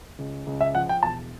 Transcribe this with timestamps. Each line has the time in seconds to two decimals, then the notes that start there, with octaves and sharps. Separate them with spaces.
0.19 C#2
0.47 C#2
0.61 E5
0.75 F3 F#5
0.89 G5
1.03 E1 A5